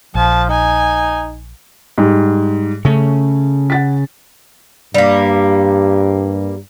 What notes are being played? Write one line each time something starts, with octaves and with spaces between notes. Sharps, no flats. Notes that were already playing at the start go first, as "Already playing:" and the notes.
A#1 F3 A5
D#4 G#5
G#2 G3
C#3 A3 C#4
F#5 A6 B6
G2 G3 A#3